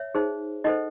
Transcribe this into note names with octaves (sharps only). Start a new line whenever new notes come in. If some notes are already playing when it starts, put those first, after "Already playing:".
Already playing: C#5 E5
D#4 G#4 C5
D#4 A4 C5 D#5 F#5